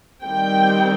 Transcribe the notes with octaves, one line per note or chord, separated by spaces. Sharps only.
D#3 G3 C4 G5